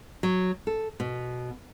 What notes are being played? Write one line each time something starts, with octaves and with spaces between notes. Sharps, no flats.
F#3
A4
B2